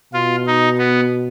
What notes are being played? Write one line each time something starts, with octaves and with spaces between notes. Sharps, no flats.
B2 F4
D#4
B3